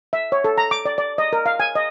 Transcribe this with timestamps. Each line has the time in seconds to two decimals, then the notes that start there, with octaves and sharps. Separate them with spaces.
0.13 E5
0.32 C#5
0.44 A4
0.58 A#5
0.71 D6
0.85 D5
0.98 D5
1.18 D#5
1.33 A#4
1.46 F5
1.60 G#5
1.75 D#5